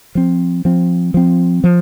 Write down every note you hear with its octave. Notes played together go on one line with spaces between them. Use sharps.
F3 C4
F3 C4
F3 C4
F3